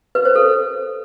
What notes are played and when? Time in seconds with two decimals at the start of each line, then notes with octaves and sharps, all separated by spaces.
0.15 B4
0.25 C5
0.36 A4